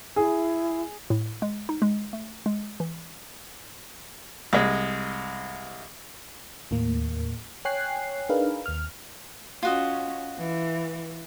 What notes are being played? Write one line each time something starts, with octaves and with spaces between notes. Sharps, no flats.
E4 G#4
A2
G#3
D#4
G#3
A3
G#3
E3
C2 G#3
D#2 A2 A#3
C#5 G5 G#5 F#6 C7
D4 D#4 G#4 A#4 B4 F5
D#2 F6
C#4 F4 F#4 D#5
E3